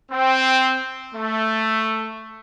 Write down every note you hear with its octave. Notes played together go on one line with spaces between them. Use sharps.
C4
A3